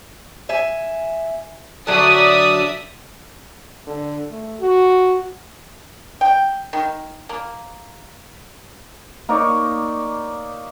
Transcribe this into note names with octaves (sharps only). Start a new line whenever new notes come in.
E5 G#5
D3 F#3 D4 D5 E5 D#6
D3
A3
F#4
G5
D#3
A#3
A#3 D#4 C#5 D5